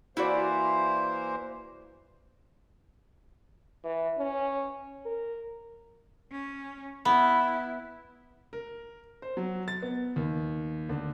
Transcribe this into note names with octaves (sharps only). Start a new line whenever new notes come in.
E3 A#3 E4 F#4 C5 D5
E3
C#4
A#4
C#4
B3 E4 B5
A#4
C5
F#3
A6
B3
D#2
D2